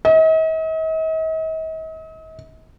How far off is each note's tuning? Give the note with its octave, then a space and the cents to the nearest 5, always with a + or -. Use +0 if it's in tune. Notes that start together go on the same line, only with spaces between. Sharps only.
D#5 +45